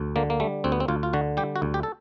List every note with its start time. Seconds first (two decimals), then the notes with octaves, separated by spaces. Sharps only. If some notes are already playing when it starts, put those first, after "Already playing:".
Already playing: D2
0.16 D3 A#3
0.30 A#3
0.40 G3 A3
0.64 D2 C4
0.72 B3
0.80 C4
0.88 D2 F4
1.03 F4
1.13 D3 F#4
1.37 G3 G4
1.56 F#4
1.62 D2
1.74 G4
1.83 A4